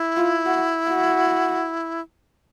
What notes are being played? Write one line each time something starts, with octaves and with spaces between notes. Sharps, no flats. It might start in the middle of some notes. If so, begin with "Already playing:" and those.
Already playing: E4
F4
F#4
F#4